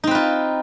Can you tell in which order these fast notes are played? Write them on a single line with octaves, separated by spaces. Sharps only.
D#4 C4 B4 F4